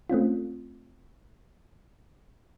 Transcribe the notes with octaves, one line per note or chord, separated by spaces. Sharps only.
A3 C4 C#4 F4